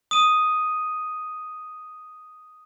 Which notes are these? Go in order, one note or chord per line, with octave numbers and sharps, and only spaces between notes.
D#6 D#7